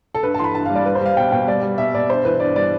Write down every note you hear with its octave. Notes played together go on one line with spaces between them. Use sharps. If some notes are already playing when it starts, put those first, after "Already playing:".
A4
G2 B4
E3 A5 C6
B5
G2 A5
G3 F5
D5
G3 B4
C5
G3 F5
B2 G5
B2 G5
G3 D5
G3
B2 E5
B2 D5
G2 C5
E3 B4
G2 D5
G3 D5